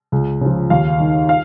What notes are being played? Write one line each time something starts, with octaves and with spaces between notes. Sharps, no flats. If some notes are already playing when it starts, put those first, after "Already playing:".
C#2
C#3 F3
D#2 F5
D#3
F5